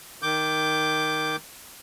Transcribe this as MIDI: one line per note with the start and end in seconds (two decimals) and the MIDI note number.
0.22 1.36 51
0.22 1.36 86
0.22 1.36 91